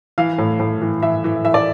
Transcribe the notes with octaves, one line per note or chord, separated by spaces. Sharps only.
E3 F5
A2
A2
E3
E3 E5
E3
E3 E5
D5